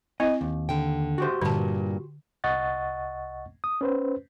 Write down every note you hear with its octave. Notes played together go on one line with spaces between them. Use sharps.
C4 E4 D#5
D#2
D3 G5
F#4 G4 C5
G2 A#2 D3 A5
C2 D#5 F#5 C#6 A6
D#6
C#4 B4 C5